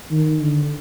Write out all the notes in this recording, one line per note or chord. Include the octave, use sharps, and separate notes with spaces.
D#3
D3